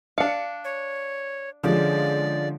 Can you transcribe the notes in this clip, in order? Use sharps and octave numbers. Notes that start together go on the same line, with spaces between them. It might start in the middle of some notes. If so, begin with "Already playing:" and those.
D4 F5 C#7
C#5
D3 F3 G#3 C#4 G#4 D5